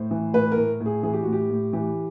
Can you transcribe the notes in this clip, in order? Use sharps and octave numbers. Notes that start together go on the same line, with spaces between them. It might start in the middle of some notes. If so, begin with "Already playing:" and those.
Already playing: A2 C5
E3
A2 B4
A2 A#4
A2
G#4
E3 G#4
G4
A2 F#4
G4
A2
E3 G4